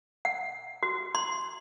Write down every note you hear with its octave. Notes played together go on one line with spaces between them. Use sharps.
F#5
F#4
C6